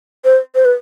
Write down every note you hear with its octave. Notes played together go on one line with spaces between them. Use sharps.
C5
C5
B4